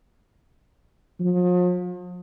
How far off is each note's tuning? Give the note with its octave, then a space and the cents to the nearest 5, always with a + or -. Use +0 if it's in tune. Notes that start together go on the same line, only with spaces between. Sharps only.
F3 +40